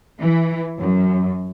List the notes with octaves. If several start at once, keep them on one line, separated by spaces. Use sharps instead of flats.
E3
F#2